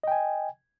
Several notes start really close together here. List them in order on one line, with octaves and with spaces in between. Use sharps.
D#5 G5 G#5